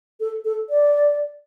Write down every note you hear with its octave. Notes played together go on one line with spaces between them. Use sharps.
A4
A4
D5